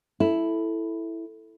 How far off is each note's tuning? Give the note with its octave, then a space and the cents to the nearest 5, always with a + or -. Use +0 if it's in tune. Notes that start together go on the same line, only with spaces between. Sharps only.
E4 +0 A4 +0